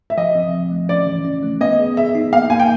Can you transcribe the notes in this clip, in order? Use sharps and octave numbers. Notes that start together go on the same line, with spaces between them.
E5
F3 D#5
C4
F3
A3
C#4 D5
E3
C#4
A3
B3 D#5
G#4
G#4 E5
D#4
A#3 F5
A#3 G#5
G5